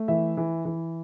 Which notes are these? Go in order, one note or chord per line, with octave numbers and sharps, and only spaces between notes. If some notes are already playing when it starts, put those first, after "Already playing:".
Already playing: A3
E3 E5
E3
E3